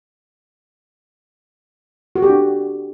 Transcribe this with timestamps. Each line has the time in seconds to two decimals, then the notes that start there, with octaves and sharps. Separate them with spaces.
2.16 F#4
2.22 G4
2.29 D4